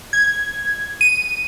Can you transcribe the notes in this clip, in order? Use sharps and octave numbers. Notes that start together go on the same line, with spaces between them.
G#6
D#7